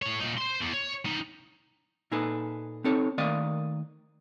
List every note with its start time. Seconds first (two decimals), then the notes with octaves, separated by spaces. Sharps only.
0.02 A2 C#5
0.20 A#2 D#4
0.38 C5 C6
0.62 E2
0.74 C#5
1.06 G3 D#4
2.11 A#2 D#4 G#4 A4 B4
2.84 C4 D#4 A4 C#5
3.18 D#3 A3 A#3 D5 D#5 F5